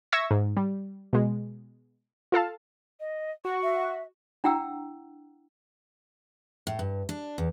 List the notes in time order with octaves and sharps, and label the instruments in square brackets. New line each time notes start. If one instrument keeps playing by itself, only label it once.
[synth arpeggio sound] E5 C#6 E6 G#6 A#6
G#2
G3
B2 G#3
F4 A4 F5 A5
[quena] D#5
[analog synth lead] F#4 [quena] C#6
[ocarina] E5
[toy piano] D4 E4 F#5 G5 A#5 E6
[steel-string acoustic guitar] A2
G2
D4
E2